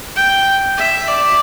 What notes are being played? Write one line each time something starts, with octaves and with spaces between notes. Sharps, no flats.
G5
E5
D5